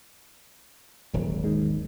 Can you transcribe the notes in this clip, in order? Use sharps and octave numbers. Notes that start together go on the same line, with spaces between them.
D#1 G#1 E2 F#3
D#3 G#3